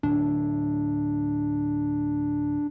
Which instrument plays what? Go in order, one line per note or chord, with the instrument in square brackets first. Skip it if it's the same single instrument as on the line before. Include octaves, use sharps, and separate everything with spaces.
[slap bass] D1 A2 [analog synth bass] D4